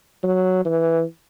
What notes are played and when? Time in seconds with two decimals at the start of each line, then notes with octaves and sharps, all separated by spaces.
0.24 F#3
0.65 E3